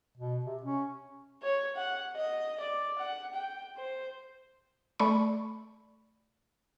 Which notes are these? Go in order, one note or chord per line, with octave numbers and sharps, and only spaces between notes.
B2
C3
C#4
C#5
F#5
D#5
D5
F#5
G5
C5
A3 D5 B5 C#6